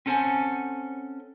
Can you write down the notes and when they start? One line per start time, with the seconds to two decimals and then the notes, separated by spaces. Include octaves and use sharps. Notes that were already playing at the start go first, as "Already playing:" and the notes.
0.06 C4 C#4 A4 C5 F#5 G#5